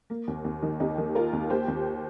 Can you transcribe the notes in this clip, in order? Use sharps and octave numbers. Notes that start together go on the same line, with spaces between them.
A#3
D#2
D#2
D#3
D#2 D#4 G4
D#3
A#3 F4 A#4
D#2
A#3 G4 C5
D#2